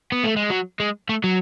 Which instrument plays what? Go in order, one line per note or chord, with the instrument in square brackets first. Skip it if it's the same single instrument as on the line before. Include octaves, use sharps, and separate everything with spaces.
[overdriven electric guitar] B3
A3
G#3
F#3
G#3
A3
F#3